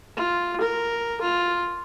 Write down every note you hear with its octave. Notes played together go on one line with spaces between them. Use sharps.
F4
A#4
F4